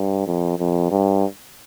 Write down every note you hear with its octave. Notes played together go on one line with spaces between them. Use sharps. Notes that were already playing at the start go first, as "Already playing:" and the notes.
Already playing: G2
F2
F2
G2